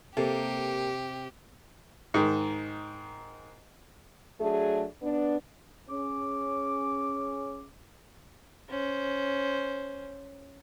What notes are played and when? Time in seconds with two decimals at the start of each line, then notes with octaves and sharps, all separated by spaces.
0.17 C3 A#3 G4 A4
2.14 G#2 D#3
4.40 F#3 A3 D4 G#4
5.01 B3 D4
5.89 C#4 G#4 D6
8.69 C#4 C5